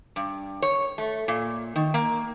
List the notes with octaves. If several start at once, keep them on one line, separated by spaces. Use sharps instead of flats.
G2
C#5
A3
A#2
D#3
A#3